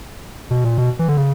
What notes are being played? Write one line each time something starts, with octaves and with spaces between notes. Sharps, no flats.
B2
A#2
B2
E3
D3
C#3